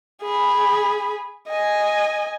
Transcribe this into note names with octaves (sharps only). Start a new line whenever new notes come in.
G#4 B5
D#5 G#5